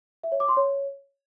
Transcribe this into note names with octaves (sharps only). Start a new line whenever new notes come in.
E5
C#5
D6
C6
C#5